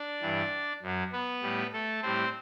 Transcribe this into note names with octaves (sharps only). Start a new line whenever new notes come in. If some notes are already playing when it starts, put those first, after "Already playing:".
Already playing: D4 D5
G2 E3 G3
F#2 F#3
B3 B4
A2 G3
A3 A4
A2 G3 C4 C5